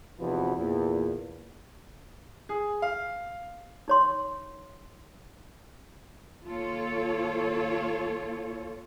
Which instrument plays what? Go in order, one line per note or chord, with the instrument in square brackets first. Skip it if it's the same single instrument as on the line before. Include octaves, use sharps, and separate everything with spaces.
[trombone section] E2 C3 F3 D#4 F#4 B4
E2 A#2
[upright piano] G#4
F5
[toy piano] D#4 C#5 C6
[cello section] D#2 F4 A4 C#5